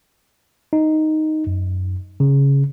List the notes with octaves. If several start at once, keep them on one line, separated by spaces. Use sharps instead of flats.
D#4
F#2
C#3